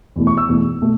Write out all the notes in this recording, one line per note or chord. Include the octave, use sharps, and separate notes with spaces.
E2 B2 A3 E4
C#6
E6
E2 B2 A3 E4
B2 A3